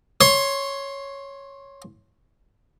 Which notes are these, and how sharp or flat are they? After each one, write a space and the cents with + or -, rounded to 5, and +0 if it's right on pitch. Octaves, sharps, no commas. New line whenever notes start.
C#5 +0 C6 +15